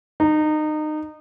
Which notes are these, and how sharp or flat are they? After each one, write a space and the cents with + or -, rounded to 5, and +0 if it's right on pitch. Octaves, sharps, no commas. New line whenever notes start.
D#4 -25